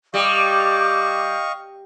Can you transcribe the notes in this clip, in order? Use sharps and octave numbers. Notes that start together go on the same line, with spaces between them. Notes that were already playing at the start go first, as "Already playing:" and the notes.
G3 D#5 F5 C#6 D6